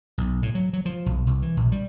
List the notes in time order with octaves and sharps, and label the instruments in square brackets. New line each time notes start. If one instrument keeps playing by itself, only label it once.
[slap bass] B1
A2
F#3
F#3
F3
B1
C2
E3
A#1
G3